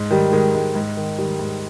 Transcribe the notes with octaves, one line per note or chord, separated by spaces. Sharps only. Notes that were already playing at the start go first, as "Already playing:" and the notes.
Already playing: G#2
D#3 G3
D#3 G#3
G#2
G#2
D#3
D#3 G3
G#2